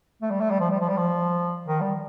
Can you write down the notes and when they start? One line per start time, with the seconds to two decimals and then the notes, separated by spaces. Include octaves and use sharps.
0.22 A3
0.31 G3
0.40 A3
0.51 G3
0.60 F3
0.70 G3
0.80 F3
0.89 G3
0.97 F3
1.68 D#3
1.81 G3